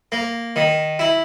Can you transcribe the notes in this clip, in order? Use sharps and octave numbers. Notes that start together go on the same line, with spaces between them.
A#3
D#3
E4